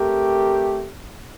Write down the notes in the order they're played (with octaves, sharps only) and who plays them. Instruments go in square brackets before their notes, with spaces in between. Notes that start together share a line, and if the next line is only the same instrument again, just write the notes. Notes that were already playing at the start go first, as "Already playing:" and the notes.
Already playing: [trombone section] A3 C4 G4 A#4